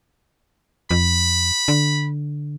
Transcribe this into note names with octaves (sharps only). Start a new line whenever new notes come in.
F2 B5
D3